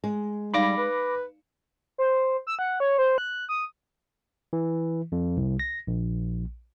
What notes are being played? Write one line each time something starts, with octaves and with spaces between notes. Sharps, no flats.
G#3
G3 D#4 D5 F5 B5 D6 A#6
B4
C5
E6
F#5
C#5
C5
F#6
D#6
E3
F2
C2
A#6
A#1